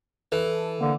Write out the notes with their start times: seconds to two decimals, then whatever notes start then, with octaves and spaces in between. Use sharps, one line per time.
0.32 E3 A4
0.81 D3 A#3